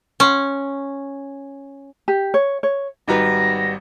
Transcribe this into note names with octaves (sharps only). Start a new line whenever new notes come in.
C#4 F#5 C6 C#6
G4
C#5
C#5
G#1 G3 D#4 F#4 B4 A#5 A#6